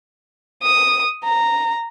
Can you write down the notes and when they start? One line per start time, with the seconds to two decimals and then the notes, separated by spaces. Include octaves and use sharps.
0.62 D#6
1.24 A#5